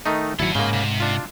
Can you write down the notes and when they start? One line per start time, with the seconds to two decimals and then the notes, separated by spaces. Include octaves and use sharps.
0.06 D#3 A3 D#4
0.40 A1 D#3 F#3 E4 A4 F#5
0.55 G#2 C#3 A#3 A#4 C6
0.73 C3
1.00 D4 F4